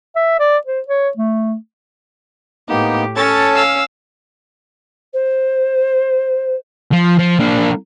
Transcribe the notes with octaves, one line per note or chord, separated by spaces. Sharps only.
E5
D5
C5
C#5
A3
A2 A#3 B3 D#4 G4
C#4 A4 C#5 A5 A6
F5 E6
C5
F3
F3
A#3 D4